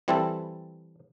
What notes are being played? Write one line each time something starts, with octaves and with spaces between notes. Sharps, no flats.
E3 G3 C4 E4 A4